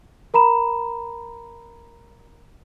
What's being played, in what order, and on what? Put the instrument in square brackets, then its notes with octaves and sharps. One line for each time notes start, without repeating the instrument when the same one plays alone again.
[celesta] A#4 A#5 B5 E7